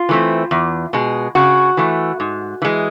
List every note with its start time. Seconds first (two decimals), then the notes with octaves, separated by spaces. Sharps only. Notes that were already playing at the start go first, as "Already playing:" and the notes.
Already playing: F4
0.09 E3 A3 C4
0.51 E2
0.93 B2 G#3
1.35 C#3 F#4
1.77 E3 A3
2.20 G#2
2.62 E3 G#3